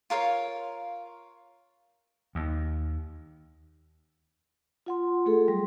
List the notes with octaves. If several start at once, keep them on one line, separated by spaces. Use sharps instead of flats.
F4 A#4 C#5 F5
D#2
F4 F#5 C6
A3 G#4 A4
F#3 G3